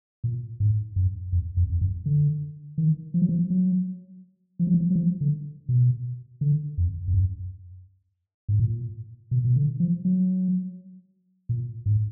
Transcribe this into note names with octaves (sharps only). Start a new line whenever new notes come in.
A#2
G#2
F#2
F2
F2
F2
F#2
D3
D#3
F3
F#3
F3
F#3
F3
F#3
F3
F#3
F3
D3
B2
D3
F2
F2
F#2
G#2
A#2
B2
B2
D3
F3
F#3
A#2
G#2